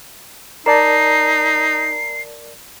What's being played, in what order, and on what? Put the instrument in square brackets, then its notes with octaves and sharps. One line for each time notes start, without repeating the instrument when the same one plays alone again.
[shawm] D#4 [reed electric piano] A#4 D5 A5 [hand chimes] A#5 [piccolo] C7